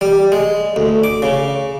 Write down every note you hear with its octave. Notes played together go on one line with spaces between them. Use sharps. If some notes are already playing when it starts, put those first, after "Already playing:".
G3
G#3
D2
D6
C#3